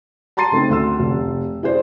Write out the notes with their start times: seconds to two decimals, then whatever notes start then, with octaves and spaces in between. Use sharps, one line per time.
0.37 A5 A#5 C6 A6 C7 D#7
0.52 C#3 A3 C4 D#4
0.70 D2 C6 E6
0.99 F1
1.63 E4 G#4 C5 D5